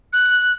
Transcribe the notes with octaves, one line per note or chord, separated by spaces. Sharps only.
F#6